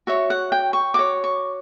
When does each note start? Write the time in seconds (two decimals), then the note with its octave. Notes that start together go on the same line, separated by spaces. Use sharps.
0.07 F#4 C#5 E5
0.30 F#5
0.52 G5
0.73 C#6
0.94 F#4 C#5 D6
1.24 C#6